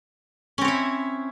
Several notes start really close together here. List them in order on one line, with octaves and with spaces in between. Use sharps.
C#4 C4 C#5 E4